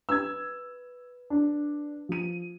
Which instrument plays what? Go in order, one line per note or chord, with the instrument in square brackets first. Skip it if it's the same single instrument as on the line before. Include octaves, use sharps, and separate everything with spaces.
[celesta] B4 [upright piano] E6 G#6
[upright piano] D4
F3 D#7